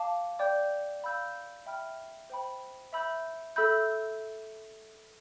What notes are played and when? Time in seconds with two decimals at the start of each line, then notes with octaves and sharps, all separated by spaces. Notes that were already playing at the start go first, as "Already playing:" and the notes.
Already playing: F5 A5 D6
0.39 D5 G5 D6 G6
1.03 F5 B5 E6 G6
1.66 E5 G5 B5 F6
2.30 C5 G5 B5
2.93 E5 B5 E6 G6
3.56 A4 E5 B5 E6 G6